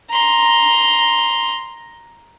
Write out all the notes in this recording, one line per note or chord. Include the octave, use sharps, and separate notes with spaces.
A#5 C6